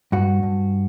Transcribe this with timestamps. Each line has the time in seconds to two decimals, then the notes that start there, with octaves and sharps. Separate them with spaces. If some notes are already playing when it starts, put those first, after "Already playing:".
0.12 G2 F#4
0.43 G2